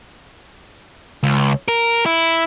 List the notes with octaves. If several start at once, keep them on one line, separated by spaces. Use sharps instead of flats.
C#2
A#4
E4